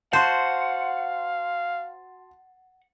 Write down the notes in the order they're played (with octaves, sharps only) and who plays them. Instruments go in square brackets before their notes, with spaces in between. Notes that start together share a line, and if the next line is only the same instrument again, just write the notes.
[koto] F#4 C5 [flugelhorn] F5 [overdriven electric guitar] F#5 [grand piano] A5 C6